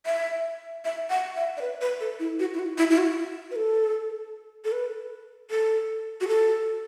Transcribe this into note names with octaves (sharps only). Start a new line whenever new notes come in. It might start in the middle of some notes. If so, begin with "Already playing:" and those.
E5
E5
F#5
E5
D5
B4
B4
A4
E4
F#4
E4
F#4
E4
E4
F#4
B4
A4
A4
B4
A4
F#4
A4